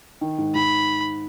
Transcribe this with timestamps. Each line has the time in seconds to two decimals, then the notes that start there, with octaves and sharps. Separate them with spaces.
0.21 D#3
0.38 G#2
0.55 G#2 B5